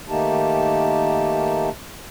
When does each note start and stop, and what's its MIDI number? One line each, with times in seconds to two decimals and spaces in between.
0.09 1.69 51
0.09 1.69 57
0.09 1.69 58
0.09 1.69 63
0.09 1.69 67
0.09 1.69 81